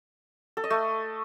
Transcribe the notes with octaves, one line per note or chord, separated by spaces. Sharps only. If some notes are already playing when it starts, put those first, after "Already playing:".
A4
D#5
A3